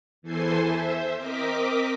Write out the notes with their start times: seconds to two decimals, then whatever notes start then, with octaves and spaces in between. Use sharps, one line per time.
0.22 E2 E3 A4 C5 G#5 C6
0.66 C5 E5
1.17 C4 A#4 D#5 D6 B6